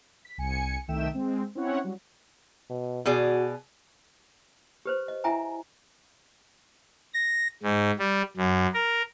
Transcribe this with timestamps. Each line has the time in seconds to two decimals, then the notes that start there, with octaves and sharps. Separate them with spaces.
0.25 B6
0.38 C2 G#5 C#7
0.88 C2 D#3 A3 E5 G5 E7
1.14 G#3 C4
1.55 C4 C#4 E4 C#5 F#5
1.84 F#3 G3
2.70 B2
3.05 B2 F#4 G#4 D5
4.86 G4 B4 C5
5.08 D#5
5.24 E4 E5 G5 G#5 A#5
7.14 A#6
7.63 G#2
7.99 G3
8.37 F#2
8.74 A#4